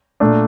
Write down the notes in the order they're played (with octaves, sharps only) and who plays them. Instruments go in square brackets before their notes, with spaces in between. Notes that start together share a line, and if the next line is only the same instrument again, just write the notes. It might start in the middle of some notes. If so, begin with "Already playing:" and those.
[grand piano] A#2 A3 D4